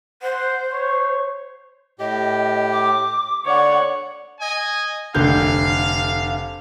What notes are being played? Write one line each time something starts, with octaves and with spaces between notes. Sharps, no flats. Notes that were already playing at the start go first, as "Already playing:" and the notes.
C5 F#5
C#5
A2 G4 D#5
D6
D3 C#5 D5 F#5
D#5 G#5
F1 D3 F5 G6